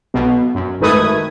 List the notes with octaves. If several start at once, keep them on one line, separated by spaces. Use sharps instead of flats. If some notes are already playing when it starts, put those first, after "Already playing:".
B1 B2
F#2
G#1 D#3 A3 B4 D#6 G#6